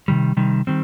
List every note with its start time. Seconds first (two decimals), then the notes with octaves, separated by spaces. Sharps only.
0.08 C3 D#3 G3
0.37 C3 D#3 G3
0.67 D#3 G3 C4